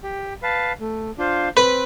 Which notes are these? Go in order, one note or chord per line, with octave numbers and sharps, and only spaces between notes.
G4
B4 F5 A5
A3
D4 F4 C5 F5
C4 B4